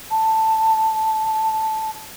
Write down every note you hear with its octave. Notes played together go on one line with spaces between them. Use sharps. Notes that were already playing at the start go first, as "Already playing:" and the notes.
A5